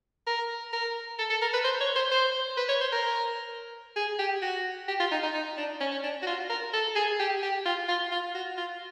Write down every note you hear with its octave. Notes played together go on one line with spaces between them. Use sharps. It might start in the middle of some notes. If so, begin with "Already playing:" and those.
A#4
A#4
A4
A4
A#4
B4
C5
C#5
C5
C5
B4
C#5
C5
A#4
G#4
G4
F#4
G4
F4
D#4
D#4
D#4
D4
C#4
C#4
D4
F#4
F4
A#4
A4
G#4
G4
G4
F4
F4
F4
F#4
F4